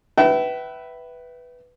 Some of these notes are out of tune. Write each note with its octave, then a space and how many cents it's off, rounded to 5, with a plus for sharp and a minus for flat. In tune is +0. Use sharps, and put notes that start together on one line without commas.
B4 +0 E5 +0 G5 -40